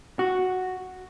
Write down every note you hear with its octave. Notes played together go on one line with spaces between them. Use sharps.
F#4